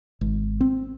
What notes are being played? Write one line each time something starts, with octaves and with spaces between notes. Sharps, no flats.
G#1
C4